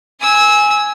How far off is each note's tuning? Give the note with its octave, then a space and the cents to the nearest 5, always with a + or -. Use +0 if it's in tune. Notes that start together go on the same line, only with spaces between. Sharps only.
G#5 +0 E6 -25